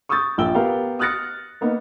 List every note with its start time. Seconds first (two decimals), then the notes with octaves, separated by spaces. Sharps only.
0.09 C#6 D#6 E6 G6 A6
0.38 A#1 G5 E6 G7
0.55 B3 G4 A#4 F5
0.99 D#6 F6 F#6 A6 A#6 C#7
1.61 A#3 B3 D#4